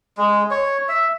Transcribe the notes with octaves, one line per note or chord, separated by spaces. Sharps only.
G#3
C#5
E5